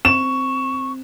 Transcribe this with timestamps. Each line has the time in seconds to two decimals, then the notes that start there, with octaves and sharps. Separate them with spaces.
0.05 C4 C#6 E7